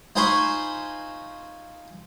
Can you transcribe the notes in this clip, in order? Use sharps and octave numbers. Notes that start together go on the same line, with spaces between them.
D#4 F4 C5 G#5 B5 C#6